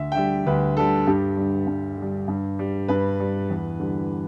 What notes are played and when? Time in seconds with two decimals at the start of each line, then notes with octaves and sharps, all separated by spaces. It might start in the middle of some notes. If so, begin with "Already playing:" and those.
Already playing: D2 E5
0.12 G5
0.15 D3 G3 E5
0.46 D2 B4
0.77 D3 G3 A4
1.06 G2 G4
1.37 D3 G3
1.67 G2
1.97 D3 G3
2.28 G2
2.59 G3
2.88 G2 B4
3.20 G3
3.50 E2
3.80 D3 G3